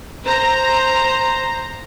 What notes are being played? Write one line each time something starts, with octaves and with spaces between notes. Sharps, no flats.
C5 A#5